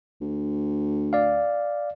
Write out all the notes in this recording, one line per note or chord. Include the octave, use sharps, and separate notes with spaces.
D2
D5 F5